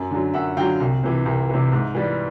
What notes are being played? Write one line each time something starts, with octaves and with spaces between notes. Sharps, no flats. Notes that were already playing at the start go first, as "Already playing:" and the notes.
Already playing: F#2
D3 F#3
F#2 E5 F#5
D3 F#3 F5 G5
C2
C3 E3
C2
C3 E3
G#2
E3 G3